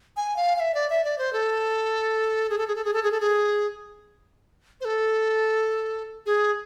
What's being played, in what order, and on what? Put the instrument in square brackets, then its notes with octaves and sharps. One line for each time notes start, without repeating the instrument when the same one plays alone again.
[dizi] G#5
F5
F5
E5
D5
E5
D5
C5
A4
G#4
A4
G#4
A4
G#4
A4
G#4
A4
G#4
C5
A4
G#4